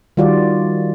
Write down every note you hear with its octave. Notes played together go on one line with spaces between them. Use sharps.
D#3 G3 F4 F#4 D5